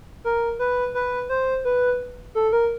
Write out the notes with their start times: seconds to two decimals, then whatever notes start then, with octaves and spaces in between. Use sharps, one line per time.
0.24 A#4
0.59 B4
0.95 B4
1.29 C5
1.65 B4
2.35 A4
2.53 A#4